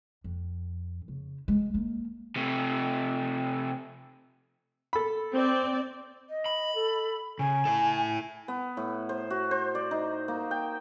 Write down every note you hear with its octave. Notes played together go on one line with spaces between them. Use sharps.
F2
C#3
G#3
A#3
C3 A3
A4 B5
C4 D5
D#5
B5
A4
C#3 G#5
E4 A4
B3
A2
C5
F#4
C5
D5
D#4
A#3
G5